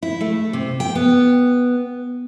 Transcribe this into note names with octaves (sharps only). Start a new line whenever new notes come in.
E4
A3
C3
G5
B3